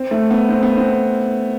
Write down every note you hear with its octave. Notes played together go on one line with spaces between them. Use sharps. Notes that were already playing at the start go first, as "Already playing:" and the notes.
Already playing: C4
A3
B3
C4
B3
C4